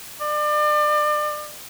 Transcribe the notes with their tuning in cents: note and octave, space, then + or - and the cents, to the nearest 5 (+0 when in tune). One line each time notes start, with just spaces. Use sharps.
D5 +35